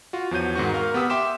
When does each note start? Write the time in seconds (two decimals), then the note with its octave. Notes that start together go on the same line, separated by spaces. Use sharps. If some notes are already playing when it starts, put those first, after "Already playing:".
0.13 F4 F#4
0.31 E2 F3 F#4 C#5 G6 D#7
0.55 G#2 D#3 C4 F#4 C#6
0.74 A#4 F5 C#6 F6
0.94 B3 G4 F#5 D#6 E6 B6
1.10 E5 G5 C6 D6 B6 E7